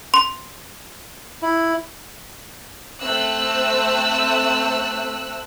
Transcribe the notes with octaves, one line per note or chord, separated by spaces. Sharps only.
C6
E4
A3 C4 E6 F#6